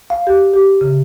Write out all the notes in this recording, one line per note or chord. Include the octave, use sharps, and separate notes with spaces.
F5
G4
G4
C#3